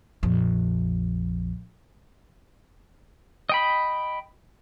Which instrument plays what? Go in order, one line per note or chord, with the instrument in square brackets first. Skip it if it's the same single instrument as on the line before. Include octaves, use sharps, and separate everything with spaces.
[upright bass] A#1 F2
[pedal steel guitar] D#5 G5 B5